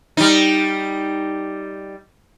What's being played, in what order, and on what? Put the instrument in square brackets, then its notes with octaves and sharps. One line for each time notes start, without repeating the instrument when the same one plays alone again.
[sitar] G3 D#4